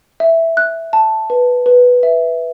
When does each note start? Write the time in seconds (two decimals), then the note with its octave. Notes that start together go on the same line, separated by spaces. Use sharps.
0.20 E5
0.57 F#6
0.93 A5
1.30 B4
1.66 B4
2.03 E5